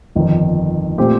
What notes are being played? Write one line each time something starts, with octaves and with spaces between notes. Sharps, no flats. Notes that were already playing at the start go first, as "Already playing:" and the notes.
G1 F2 D#3
A#2 A3 C4 G4